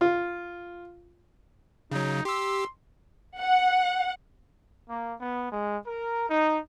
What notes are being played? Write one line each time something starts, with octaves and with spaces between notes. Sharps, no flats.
F4
C#3 F#3 D#4
G4 C6 E6
F#5
A#3
B3
G#3
A#4
D#4